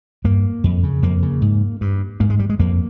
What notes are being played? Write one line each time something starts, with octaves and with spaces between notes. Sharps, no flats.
G2 A#3
F2
C#3
F2 A#3
C#3
G#2
G2
G#2 A#3
G#3
G3
G#3
F2 A#3